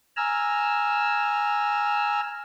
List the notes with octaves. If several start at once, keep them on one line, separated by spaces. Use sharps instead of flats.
G#5 A#5 E6 F6